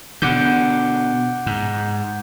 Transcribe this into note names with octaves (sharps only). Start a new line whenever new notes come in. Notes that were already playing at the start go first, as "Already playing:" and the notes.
B2 D3 F#5 D6 G6
G#2